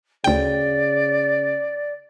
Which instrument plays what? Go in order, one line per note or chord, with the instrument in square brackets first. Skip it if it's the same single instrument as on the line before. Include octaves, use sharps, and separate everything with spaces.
[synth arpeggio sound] D2 G5 [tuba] C#3 [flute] D5